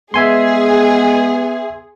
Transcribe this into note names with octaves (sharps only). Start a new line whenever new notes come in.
G#3 B3 G#4 E5 G#5 C6